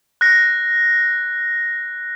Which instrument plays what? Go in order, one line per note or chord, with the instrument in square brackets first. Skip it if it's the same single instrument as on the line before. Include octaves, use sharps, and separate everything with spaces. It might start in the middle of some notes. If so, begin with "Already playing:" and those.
[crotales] F#6 A#6